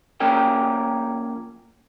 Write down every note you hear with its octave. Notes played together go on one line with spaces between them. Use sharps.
F3 A#3 C#4 A#4 G5